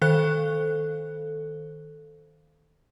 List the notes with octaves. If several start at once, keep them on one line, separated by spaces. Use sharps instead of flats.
D#3 A4 C5 F5 F#6